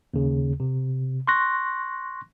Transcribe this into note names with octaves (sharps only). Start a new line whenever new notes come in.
D#2 C#3
C3
C6 C#6 F#6 A#6